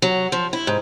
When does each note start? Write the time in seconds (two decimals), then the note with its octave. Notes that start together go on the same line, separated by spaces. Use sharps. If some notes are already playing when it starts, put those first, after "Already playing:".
0.02 F#3
0.32 F3
0.53 E4
0.67 G#2